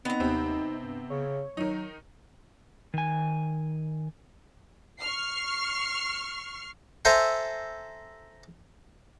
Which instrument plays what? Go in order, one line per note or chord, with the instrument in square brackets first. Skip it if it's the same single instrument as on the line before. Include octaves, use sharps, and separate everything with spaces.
[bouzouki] B3 A#5 [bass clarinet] C4 [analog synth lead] D#4
[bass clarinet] D#2 [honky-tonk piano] C3 C4
[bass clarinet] G2
[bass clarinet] C#3 [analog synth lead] C#5
[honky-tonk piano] D#3 D#4 [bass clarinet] F#3
[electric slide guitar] D#3 G#5
[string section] C#6 F6 C7
[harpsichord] A4 C5 E5 G#5 A#5